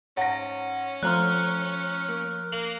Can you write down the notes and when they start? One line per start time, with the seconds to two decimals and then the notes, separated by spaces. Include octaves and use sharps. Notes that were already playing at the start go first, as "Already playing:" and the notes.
0.17 G#2 C#4 C#5 F#5 A#6
1.03 F3 A3 C4 F4 A#5 C6 F6 F#6
2.08 A#3
2.52 A#3 F#7